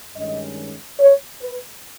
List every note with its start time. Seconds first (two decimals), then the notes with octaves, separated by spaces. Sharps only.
0.14 G2 D#3 G#3 C#4 D#5
1.00 C#5
1.41 B4